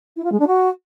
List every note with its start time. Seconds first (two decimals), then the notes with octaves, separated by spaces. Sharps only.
0.16 E4
0.24 F4
0.32 G#3
0.40 D4
0.47 F#4